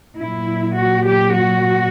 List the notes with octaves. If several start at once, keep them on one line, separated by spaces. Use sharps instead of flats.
A#2 F#3 E4
F#4
G4
F#4